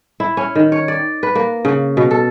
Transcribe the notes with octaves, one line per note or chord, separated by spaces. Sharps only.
E4
C#4
D#3
C#5
D5
B4
A#3
C#3
B2
A4